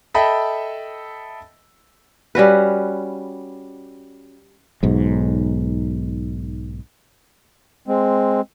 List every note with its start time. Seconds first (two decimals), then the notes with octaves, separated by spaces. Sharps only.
0.14 A4 D#5 E5 G5 B5
2.35 G3 C#4 F#4 B4
4.83 B1 G#2
7.88 G#3 C4